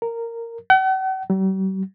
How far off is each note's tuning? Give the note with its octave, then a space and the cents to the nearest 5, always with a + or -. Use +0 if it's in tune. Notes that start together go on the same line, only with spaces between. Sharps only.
A#4 -10
F#5 +45
G3 -45